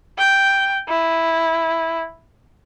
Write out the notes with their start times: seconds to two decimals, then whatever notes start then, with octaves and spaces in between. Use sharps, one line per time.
0.18 G5
0.88 E4